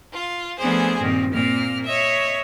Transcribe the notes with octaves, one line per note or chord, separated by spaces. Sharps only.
F4
F3 A3 B3 D4 G#4 C5
G2 A#2 D#3 C4
A#2 A#3 C4 F6
C#5 D#5 E5